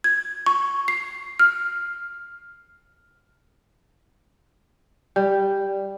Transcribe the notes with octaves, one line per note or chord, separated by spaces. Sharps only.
G#6
C#6
C7
F6
G3